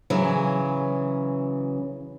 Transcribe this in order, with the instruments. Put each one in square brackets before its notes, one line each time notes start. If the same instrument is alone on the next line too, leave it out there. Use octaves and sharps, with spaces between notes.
[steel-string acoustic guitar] C#3 E3 F#3